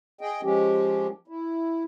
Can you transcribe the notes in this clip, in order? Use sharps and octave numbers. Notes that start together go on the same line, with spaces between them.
G#4 D#5 G5
F3 G#3 C#4 G4
E4